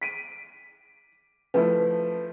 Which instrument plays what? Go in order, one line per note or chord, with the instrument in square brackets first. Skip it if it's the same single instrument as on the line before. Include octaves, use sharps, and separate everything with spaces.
[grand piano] B6 D7 D#7
[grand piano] F3 A3 E4 [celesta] B4